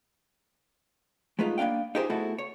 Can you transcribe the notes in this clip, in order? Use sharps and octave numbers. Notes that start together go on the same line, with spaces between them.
G#3 A3 B3 D#4 F4
A#3 B3 D4 F5 G5
D#4 F4 G4 G#4 A#4 C5
A3 B3 E4 F#4 G#4 A4
C#5